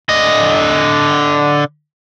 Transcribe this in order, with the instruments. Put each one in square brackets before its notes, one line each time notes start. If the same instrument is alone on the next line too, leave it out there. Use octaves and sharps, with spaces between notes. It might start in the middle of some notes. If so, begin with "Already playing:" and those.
[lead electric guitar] D3 D#5